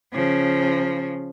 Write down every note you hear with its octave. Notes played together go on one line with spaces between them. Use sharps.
C#3 F3